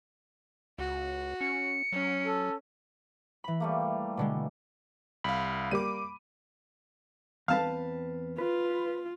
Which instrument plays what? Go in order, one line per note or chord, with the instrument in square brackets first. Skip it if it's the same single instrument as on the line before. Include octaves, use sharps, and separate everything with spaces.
[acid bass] C#2 [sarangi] F#4
[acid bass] C#4 [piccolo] C#7
[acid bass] F#3 [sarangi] C#4
[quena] A4
[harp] E3 B5
[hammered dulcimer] G3 A3 A#3
[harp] B2 D3 G#3
[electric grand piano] C2 F5 [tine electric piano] B5
[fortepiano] G3 A#3 [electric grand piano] D6 D#7
[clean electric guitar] E2 C4 B4 [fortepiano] F5 A5
[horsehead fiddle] F4 [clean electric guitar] B4